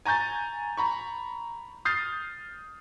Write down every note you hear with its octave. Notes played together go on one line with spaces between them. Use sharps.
G#5 A#5 C#6 G6 A6
A#5 B5 C#6
D#6 F6 G6 A6 C7